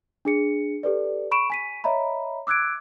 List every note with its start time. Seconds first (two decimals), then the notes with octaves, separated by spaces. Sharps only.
0.25 D4 G#4 C#7
0.83 G4 A4 B4 D5
1.31 B5 C#6 D7 E7
1.50 G#5 B6 D#7
1.84 C#5 D#5 E5 A#5 B5
2.47 D6 E6 F#6 G#6 D7